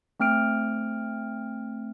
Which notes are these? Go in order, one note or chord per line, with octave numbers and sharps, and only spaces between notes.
A3 C4 F6 D7